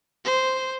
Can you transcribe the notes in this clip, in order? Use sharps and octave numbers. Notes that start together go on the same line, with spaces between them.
C5